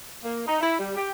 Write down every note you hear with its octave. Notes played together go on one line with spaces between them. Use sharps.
A#3
D#4
E4
G3
G4